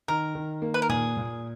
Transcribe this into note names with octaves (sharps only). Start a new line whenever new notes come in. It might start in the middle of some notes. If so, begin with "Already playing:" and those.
D#3 A#4
D#3
A#3
B4
A#4
A#2 G#4
A#2